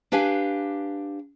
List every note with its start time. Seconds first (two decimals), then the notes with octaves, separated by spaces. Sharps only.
0.12 D4 G4 B4 F5 G#5